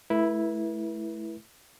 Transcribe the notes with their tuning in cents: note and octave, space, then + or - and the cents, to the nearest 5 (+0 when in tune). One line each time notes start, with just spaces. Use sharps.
A3 -30 E4 +0 B4 -40